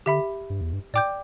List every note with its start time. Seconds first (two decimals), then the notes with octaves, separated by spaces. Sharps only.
0.06 D3 G4 E5 B5
0.50 G2
0.61 E2
0.73 G2
0.93 A2 D5 G5 D6 G6